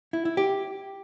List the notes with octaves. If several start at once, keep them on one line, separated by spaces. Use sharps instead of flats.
E4
E4
G4